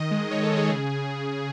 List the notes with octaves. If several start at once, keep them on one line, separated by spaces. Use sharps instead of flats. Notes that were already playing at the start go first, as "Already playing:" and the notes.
Already playing: D#3 D#5
G#3
D#3 C#5
A4
G#3
G#4
C#3